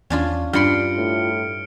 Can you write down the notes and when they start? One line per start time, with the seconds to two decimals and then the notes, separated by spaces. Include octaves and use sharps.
0.10 E2 C#4 D4 F4
0.53 G2 D4 F4 B5 C6 F6 C#7 D7
0.97 A2